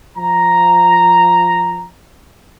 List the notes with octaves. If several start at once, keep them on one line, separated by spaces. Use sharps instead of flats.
F3 A#5